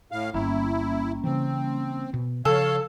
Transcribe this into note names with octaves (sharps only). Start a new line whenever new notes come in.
A2 F5
G1 G3 A#3 C#4 E4
C#3 E3 C4
B2
C#3 F3 A4 C#5 F5